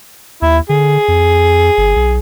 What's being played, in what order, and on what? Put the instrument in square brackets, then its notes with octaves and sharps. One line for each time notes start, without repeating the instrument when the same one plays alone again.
[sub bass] D#2 [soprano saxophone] E4
[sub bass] D3 [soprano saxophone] G#4
[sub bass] F2
G1
B1